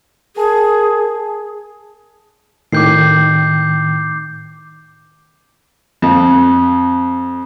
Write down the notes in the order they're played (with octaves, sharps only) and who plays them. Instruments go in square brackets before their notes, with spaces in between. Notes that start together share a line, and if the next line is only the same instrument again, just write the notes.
[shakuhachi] G#4 [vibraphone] A#4 G#5 A5
[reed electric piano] A2 D#3 G5 [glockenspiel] D6 G6 C7
[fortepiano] F2